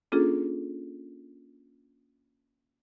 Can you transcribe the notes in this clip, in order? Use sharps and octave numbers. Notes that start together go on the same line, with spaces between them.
A#3 C#4 D4 F4 G#4 A4